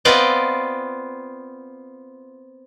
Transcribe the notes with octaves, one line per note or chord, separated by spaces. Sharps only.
B3 C4 F4 D5 D#5